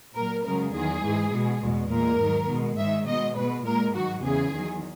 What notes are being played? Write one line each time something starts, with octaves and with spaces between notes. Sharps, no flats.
A#2 F#3 A#4
F#2 C#3 G#3 A#4
E2 D#3 F#3 G#4
G#2 E3 G#3
B2 G#3
E2 B2 G#3
A#2 G#3 A#4
G#2 D#3 F#3
B2 G#3
G#2 D#3 G#3 E5
B2 G#3 D#5
B2 G#3 B4
A#2 G#3 A#4
G#2 D#3 F#3 F#4
E2 C#3 E3 G#4
E2 D#3 F#3